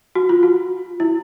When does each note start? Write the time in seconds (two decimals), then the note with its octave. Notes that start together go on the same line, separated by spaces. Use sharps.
0.15 F#4
0.29 F4
0.43 F#4
1.00 E4